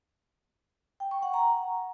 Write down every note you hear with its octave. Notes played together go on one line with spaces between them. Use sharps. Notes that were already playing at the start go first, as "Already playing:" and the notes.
G5
C#6
F#5
A#5